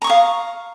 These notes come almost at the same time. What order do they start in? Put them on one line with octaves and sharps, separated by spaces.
A#5 C#6 D#6 F5